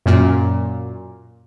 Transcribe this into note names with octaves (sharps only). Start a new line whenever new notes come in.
F#2 A#2